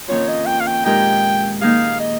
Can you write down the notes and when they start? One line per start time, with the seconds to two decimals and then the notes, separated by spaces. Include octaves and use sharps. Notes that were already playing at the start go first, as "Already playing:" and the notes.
0.08 F2 D#3 A#3 C#4 F4 C#5
0.28 D#5
0.46 G5
0.60 F5
0.66 G5
0.84 A#2 G#3 D#4 G4 A#4 G5
1.61 D#3 A#3 D#4 G#4 F5
2.00 D#5